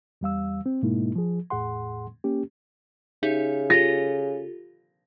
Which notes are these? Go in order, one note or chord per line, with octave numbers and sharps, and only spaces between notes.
E2 G3 F5 E6
C4
G#2 B2 G#3 A#3 D#4 E4
F3 G#4
E2 A2 G#4 F#5 C6
A#3 C#4 G4
C#3 D#4 G4 E5
F4 G4 A4 A#6